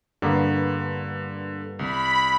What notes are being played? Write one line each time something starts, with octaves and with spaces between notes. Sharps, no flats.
G2 D3 A#3 B3
C2 B5